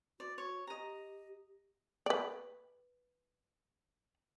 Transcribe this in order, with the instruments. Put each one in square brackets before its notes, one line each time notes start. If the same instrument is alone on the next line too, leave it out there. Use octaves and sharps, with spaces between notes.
[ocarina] F#4 [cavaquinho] D5
[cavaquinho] C#5
[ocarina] G4 [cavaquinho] D#5 A#5
[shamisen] B4 D5